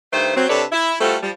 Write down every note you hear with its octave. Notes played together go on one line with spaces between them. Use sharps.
G2 D#3 A3 C5
F#3 C4
C3 D4 A4 B4 C#5 D5
E4
G3 A3 F4 F#4 A4 C5
F3 G3